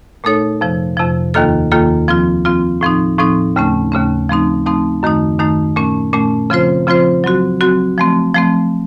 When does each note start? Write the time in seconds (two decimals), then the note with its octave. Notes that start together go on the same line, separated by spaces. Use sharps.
0.24 A#2 A3 D#4 A4 C#5
0.61 F2 C3 F3
0.97 F2 C3 F3
1.34 D#2 D#3 A#3 F4 A4
1.71 D#2 D#3 A#3 F4 A4
2.08 F3 C4 F4
2.45 F3 C4 F4
2.81 A2 F3 C4 D#4
3.19 A2 F3 C4 D#4
3.56 D#2 C#3 A3 C#4
3.92 D#2 C#3 A3 C#4
4.29 F3 A3 C4 D#4
4.66 F3 A3 C4 D#4
5.03 F#2 D#3 A3 D#4
5.39 F#2 D#3 A3 D#4
5.76 A#2 A3 C#4
6.13 A#2 A3 C#4
6.50 C#3 F3 C4 F4 C5
6.87 C#3 F3 C4 F4 C5
7.24 F#3 C4 F#4
7.61 F#3 C4 F#4
7.98 F3 A3 C4
8.34 F3 A3 C4